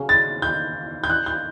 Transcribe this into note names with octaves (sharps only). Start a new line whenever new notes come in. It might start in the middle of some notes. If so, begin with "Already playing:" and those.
Already playing: C#3 F#3 C#4
A6
G6
G6
F#6
G6